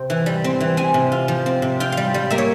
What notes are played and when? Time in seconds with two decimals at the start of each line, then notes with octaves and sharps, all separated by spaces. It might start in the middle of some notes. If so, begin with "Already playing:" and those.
Already playing: C3 C4 G5
0.10 E3
0.26 G3
0.44 C4
0.61 E3
0.77 C4 G#5
0.94 C3
1.12 F4
1.28 F3
1.46 C4
1.62 C3
1.80 F4 G5
1.92 G3 F5
2.14 G3
2.30 A#3 E5
2.38 C#5